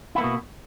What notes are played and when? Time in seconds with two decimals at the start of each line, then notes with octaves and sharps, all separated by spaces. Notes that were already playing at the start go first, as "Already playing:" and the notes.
0.15 E4
0.18 B3
0.21 A#3
0.24 B2